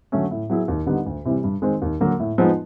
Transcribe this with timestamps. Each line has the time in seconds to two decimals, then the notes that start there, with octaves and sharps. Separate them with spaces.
0.12 D3 F#3 A3 C#4
0.31 A2
0.50 F#3 B3 E4 G#4
0.68 D#2
0.86 D3 G3 B3 D#4
1.06 D2
1.25 C3 E3 G3
1.44 G2
1.62 D#3 G#3 C4
1.82 D#2
2.01 D3 F#3 A#3
2.20 A2
2.38 F3 G#3 B3 D#4